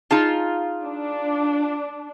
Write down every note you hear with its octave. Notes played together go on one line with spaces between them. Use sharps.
D#4 F4 G#4 A5
D4